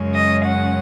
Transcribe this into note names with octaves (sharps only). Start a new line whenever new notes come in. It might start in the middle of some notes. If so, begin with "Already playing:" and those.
Already playing: F#2 C#3 G#3 C#4
D#5
F#5